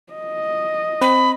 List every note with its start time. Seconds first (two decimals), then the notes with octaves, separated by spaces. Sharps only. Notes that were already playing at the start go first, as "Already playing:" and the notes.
0.13 D#5
1.01 C4 B5